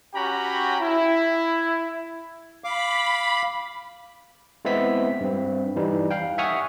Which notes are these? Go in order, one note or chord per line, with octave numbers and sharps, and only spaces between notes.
C#4 F#4 G4 G5 A#5 B5
E4
F5 B5 D6
G#3 B3 C4 E4 E5 B6
G2 C4
E3 G3 D#4
F5 G5
E5 F#5 G#5 C#6 D#6 F6